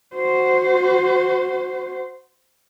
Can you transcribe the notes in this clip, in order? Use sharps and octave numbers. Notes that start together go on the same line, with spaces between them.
F#4 C5